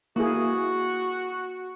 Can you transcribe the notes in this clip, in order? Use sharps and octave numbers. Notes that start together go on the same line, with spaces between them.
A#3 E4 F#4 G#4